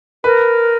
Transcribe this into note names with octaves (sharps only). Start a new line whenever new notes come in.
A#4 B4